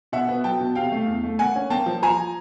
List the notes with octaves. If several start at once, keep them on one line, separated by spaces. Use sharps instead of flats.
B2 E5 F#5
B3
F#3 G5 A5
B2
C3 F5 G5
A3
E2
A3
A#3 F#5 G#5
C#4
A#3 G5 A5
F3
F3 G#5 A#5